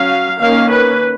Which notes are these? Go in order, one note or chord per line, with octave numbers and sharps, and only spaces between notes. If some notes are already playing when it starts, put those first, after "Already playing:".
Already playing: F#3 C#4 F5
D#3 A#3 C#4 F5
B4